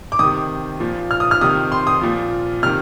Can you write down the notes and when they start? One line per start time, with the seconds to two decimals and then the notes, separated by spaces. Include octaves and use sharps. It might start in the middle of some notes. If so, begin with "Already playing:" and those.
0.12 D6
0.19 C3 D#3 D#6
0.80 A#2 F3
1.11 F6
1.20 D#6
1.31 F6
1.41 C3 D#3 D#6
1.72 C6
1.87 D#6
2.01 A#2 F3
2.63 C3 D#3 F6